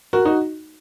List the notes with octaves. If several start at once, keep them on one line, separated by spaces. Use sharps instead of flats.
F#4 A#4
D#4 F#4